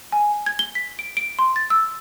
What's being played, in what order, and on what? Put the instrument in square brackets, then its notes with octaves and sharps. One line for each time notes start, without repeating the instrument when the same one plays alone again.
[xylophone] G#5
G#6
G7
B6
D7
D7
C6
A6
E6